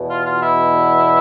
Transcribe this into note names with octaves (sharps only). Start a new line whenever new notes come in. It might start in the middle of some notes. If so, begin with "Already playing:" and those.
Already playing: E2 B2
F4
F4
E4